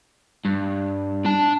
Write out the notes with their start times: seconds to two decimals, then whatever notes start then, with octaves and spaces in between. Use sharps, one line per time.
0.45 G2
1.25 D4 A5